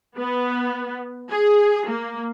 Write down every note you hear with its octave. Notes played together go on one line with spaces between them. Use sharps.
B3
G#4
A#3